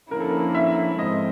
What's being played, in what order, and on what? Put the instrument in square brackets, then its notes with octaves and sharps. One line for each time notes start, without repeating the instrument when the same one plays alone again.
[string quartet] D3 F3 A#3 C#4 E4 [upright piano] A#4
[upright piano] A4
A#4
E5
[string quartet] G#2 F3 G#3 C4 [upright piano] D#5